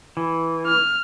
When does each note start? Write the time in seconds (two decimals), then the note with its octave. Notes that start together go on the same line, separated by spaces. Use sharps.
0.17 E3
0.67 F6